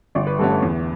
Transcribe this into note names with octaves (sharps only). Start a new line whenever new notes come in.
G1 D5
B4
G2 D3 A3 C#4 A4
B4
E2